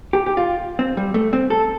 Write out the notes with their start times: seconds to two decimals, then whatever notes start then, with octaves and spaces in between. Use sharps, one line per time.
0.13 G4
0.26 G4
0.37 F4
0.79 C4
0.97 G3
1.14 A3
1.33 C4
1.50 A4